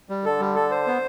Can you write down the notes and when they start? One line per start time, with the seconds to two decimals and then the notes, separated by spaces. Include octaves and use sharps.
0.09 G3
0.24 D3 A4
0.40 G3
0.55 A4
0.71 C5
0.87 B3